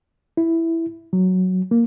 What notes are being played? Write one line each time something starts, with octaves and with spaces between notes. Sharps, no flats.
E4
F#3
A#3